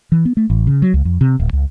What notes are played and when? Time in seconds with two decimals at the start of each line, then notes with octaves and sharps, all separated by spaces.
0.12 E3
0.25 B3
0.37 A3
0.50 A1
0.67 C#3
0.82 F#3
0.94 C#2
1.05 F2
1.21 C3
1.40 D1
1.53 C#2